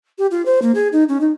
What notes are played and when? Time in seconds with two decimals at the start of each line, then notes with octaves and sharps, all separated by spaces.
0.18 G4
0.31 F4
0.45 C5
0.62 A#3
0.74 G#4
0.92 D#4
1.08 C#4
1.20 D#4